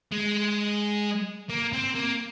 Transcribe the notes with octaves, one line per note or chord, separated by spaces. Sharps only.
G#3
A#3
C4
A#3